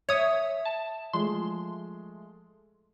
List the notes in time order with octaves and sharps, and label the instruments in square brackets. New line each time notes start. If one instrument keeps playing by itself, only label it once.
[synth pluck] C#5 D#6 [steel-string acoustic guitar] E5
[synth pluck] A5
[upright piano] F3 G#3 A3 [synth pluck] C6